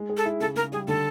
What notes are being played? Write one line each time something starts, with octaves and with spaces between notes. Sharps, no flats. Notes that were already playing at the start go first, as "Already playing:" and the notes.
Already playing: G#3
G#4
A4
E4
C#3 A4
C#3 A#4
G3 G#4
D3 A4